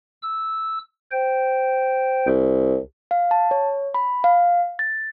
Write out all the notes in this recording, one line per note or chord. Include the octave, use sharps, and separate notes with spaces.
E6
C5 G5
C2
F5
A5
C#5
B5
F5
A6